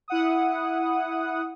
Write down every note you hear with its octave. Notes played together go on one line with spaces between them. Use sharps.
E4 F#5 D#6